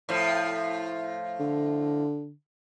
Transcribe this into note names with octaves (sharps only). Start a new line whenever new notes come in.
A2 F3
D3